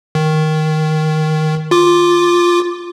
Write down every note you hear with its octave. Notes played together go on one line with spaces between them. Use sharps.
D#3
F4 D6